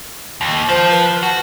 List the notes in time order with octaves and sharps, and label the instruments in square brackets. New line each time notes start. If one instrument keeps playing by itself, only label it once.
[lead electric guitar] D#2
[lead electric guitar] F3 [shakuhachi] C5
[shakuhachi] B4
[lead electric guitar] F#4 [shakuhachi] A5